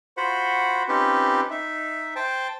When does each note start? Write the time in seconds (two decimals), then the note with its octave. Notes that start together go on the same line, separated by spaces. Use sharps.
0.17 F4 F#4 C5 F#5 B5
0.89 C4 C#4 D#4 F4 G4 B4
1.50 D#4 E5
2.16 C5 G5 A5